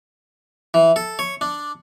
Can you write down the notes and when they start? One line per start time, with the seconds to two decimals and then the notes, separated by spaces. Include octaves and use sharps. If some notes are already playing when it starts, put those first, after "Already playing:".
0.74 E3
0.96 A4
1.19 C#5
1.41 D4